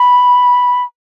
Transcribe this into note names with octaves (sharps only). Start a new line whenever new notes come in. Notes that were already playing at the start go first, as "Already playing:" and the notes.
Already playing: B5